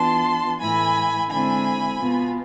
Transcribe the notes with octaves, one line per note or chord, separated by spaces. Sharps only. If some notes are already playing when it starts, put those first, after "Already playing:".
Already playing: E3 B3 D4 F4 A5 C6
A2 E3 A3 E4 G#5 B5
D3 G#3 C4 E4 G#5 B5
B2 B3 F4